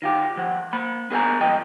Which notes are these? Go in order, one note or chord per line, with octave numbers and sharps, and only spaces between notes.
D#3 F4 G4
D#2 F3 F#5
A#3 B5
B3 G#4 A#4 D#5 G#5 A#5
C2 G#2 F3 D#5 G5